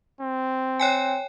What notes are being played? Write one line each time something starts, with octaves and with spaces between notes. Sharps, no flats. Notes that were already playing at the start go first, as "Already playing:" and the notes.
C4
C#5 G5 G#5